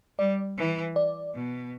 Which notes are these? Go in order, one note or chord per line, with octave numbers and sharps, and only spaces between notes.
G3 D5
E3
D5
B2